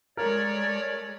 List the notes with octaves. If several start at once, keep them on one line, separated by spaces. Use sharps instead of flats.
G#3 A3 A#4 C#5 D5